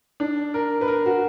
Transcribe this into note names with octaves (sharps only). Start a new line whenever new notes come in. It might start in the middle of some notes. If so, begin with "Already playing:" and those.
D4
A#4
B4
A#4
F#4